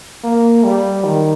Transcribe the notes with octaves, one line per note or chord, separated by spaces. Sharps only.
A#3
G3
D#3